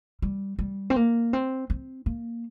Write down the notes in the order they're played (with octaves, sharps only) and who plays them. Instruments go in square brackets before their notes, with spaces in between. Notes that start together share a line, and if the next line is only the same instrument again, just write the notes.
[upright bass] G3
G3
C4
A#3
C4
C4
A#3